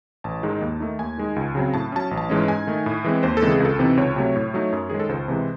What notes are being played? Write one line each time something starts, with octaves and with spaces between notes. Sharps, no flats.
A1 A5
G#2 D#3 G#3 D#4
D#2
D#3 A3 D#4
D#2 G#5
D#3 G#3 D#4
C#2
C#3 F#3 C4
A2 A5
F#3 C#4 A5
A1
A5
G#2 E3 G#3 C#4
G#2 G#5
D#3 A3 D#4
A2
E3 G#3 C4
D#2 C5
A4
C#3 E3 G#3 C4
G#4
C#2 A4
C3 E3 C4 D#4
C#2 C#5
C3 F#3 A3
A2
F#3 A3 D#4
F#2
D#3 G#3 G#4
A4
C#2 C5
C3 E3 G#3